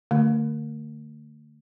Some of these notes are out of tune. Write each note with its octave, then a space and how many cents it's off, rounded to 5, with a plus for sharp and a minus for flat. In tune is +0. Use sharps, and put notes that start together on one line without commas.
D3 +10 A3 +35